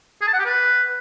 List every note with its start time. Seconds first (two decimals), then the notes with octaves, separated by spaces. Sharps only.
0.21 G#4
0.27 A5
0.33 F#5
0.39 G4
0.45 B4